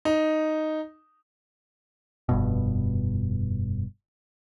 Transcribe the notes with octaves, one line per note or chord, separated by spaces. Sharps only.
D#4
F1 G2 B2